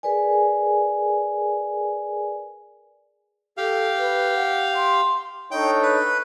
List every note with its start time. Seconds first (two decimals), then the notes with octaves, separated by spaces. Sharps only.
0.03 G#4 A#4 B4 D5 G#5
3.57 G4 A4 F5
3.99 B4
4.36 F#5
4.75 C6
5.51 D4 D#4 A4 C#5 G5
5.83 B4